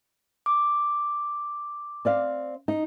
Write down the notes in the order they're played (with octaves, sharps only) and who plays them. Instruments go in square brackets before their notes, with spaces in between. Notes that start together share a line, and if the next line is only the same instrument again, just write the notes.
[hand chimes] D6
[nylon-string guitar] C4 D5 F5
D#4